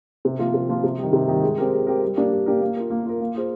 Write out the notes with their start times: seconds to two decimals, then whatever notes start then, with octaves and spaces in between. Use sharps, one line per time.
0.25 C3
0.39 F3 A#3 F4
0.54 C3
0.69 F3 A#3 F4
0.84 C3
0.98 D#3 G3
1.13 C3
1.28 D#3 G3
1.43 G#3
1.58 C4 G4 A#4
1.72 G#3
1.87 C4 G4 A#4
2.02 G3
2.16 A#3 D4 G4 A#4
2.31 G3
2.46 A#3 D4 G4 A#4
2.61 A#3
2.77 F4 A#4
2.90 A#3
3.06 F4 A#4
3.20 A#3
3.36 F4 G#4 C5